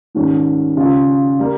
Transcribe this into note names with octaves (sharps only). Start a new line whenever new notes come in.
G#2 D#3 G3 C#4 G4
C#3 G3 C#4 F4
G3 A#3